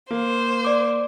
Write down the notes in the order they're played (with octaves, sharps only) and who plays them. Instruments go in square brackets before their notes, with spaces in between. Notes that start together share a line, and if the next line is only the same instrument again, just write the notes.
[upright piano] A#3 [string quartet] C5
[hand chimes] D5 D6